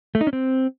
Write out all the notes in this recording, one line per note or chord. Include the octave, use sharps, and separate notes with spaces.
A3
D#4
C#4
C4